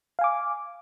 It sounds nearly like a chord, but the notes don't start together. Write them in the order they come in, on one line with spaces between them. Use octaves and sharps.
F5 G#5 D6